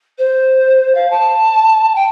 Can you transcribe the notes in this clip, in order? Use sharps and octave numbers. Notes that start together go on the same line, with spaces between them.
C5
F5
A5
G5